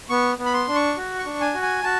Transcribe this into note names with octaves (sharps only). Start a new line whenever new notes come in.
B3 C#6
B3
B5
C6
D4
C#6
F#4
C#6
D4
G#5
F#4
G#5
F#4 A5